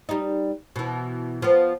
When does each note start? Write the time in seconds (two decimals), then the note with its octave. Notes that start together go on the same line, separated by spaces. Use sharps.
0.09 G3 D#4
0.76 B2 E3
1.42 F3 B3